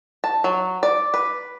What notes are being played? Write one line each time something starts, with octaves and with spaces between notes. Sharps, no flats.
A5
F#3
D5
B4